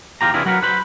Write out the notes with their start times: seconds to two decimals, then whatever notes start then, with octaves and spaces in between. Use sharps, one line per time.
0.21 E2 A#2 F4 G4 A#5
0.34 C3 E3 D4 E4 F4 G#4
0.45 F#3 F#4 A#4 B4 F#5
0.62 B4 C5 B5